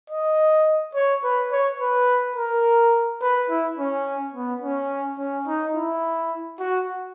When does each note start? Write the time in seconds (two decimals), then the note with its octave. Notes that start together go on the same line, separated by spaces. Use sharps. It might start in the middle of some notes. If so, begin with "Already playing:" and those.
0.10 D#5
0.95 C#5
1.24 B4
1.52 C#5
1.80 B4
2.36 A#4
3.22 B4
3.50 E4
3.77 C#4
4.34 B3
4.62 C#4
5.19 C#4
5.47 D#4
5.75 E4
6.60 F#4